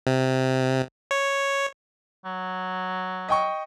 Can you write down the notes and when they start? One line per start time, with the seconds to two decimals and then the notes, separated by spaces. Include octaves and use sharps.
0.07 C3
1.11 C#5
2.25 F#3
3.29 D#5 G5 C#6